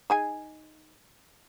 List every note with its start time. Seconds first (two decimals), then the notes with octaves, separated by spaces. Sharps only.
0.10 D#4 G#4 G#5